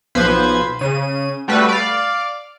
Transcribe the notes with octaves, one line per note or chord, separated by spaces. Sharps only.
B1 F3 B4 C5 G#6
C#3 D#7
G3 A3 F#4 B4
D5 F5